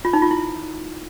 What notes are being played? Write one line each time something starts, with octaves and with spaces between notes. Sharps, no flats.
F4
D#4
F4
E4